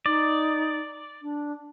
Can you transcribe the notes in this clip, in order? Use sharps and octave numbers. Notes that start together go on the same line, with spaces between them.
D#4 D5
D4